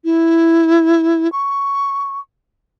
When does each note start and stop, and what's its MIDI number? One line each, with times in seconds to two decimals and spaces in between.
0.05 1.30 64
1.32 2.19 85